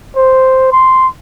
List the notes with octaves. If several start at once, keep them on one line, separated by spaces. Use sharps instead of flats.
C5
C6